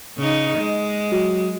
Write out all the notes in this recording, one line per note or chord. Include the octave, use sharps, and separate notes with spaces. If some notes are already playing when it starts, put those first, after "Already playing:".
C#3 D#4
G#3
F#3